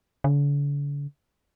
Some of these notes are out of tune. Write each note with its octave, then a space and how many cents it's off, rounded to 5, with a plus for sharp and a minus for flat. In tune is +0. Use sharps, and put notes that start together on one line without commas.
D3 -45